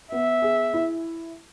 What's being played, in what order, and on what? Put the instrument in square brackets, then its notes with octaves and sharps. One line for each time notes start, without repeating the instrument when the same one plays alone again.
[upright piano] B3 [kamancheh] E5
[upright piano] G#4
E4